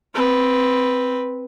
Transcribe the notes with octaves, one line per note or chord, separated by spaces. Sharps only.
C4 B4